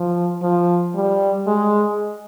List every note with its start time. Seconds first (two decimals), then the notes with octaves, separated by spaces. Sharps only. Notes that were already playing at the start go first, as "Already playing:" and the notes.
Already playing: F3
0.42 F3
0.95 G3
1.47 G#3